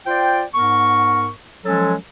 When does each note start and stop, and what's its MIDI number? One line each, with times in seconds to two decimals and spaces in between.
0.06 0.43 65
0.06 0.43 72
0.06 0.43 74
0.06 0.43 79
0.54 1.29 44
0.54 1.29 59
0.54 1.29 70
0.54 1.29 85
1.65 1.94 53
1.65 1.94 54
1.65 1.94 56
1.65 1.94 61
1.65 1.94 69